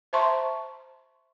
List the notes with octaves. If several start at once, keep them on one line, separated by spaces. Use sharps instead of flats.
C5 E5 A5 A#5 C6 C#6